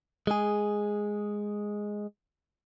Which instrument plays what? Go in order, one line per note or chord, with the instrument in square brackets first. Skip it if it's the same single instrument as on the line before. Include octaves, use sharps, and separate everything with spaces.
[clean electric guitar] G#3 G#4